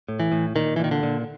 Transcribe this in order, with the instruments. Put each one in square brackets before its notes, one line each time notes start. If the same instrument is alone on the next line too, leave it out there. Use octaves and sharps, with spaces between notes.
[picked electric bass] A2
E3
A2
A#2 D#3
E3
A#2 D#3
D3
A#2